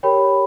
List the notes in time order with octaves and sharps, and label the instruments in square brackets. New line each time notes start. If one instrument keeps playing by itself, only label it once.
[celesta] G4 A#4 C#5 G5 B5